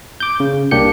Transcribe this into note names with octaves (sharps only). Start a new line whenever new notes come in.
D6 G6
C#3
C2 A#3 D4 G4 G6 C#7